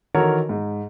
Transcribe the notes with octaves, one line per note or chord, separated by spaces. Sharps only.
D#3 E3 F#4 A4 A#4 C#5
G#2